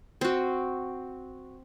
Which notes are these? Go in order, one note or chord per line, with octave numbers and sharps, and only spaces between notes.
C4 F#4